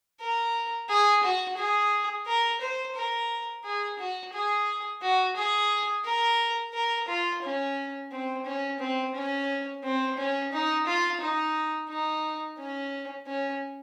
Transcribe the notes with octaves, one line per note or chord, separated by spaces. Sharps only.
A#4
G#4
F#4
G#4
A#4
C5
A#4
G#4
F#4
G#4
F#4
G#4
A#4
A#4
F4
C#4
C4
C#4
C4
C#4
C4
C#4
D#4
F4
D#4
D#4
C#4
C#4